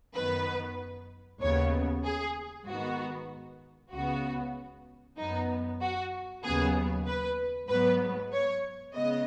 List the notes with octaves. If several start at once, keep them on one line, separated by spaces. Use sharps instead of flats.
F#2 D#3 B3 B4
D#2 C#3 B3 C#5
G#4
G#2 D#3 B3 F#4
C#2 C#3 B3 F#4
F#2 F#3 B3 D#4
F#4
D#2 C#3 F#3 B3 G#4
B4
G#2 F#3 B3 B4
C#5
C#3 G#3 B3 D#5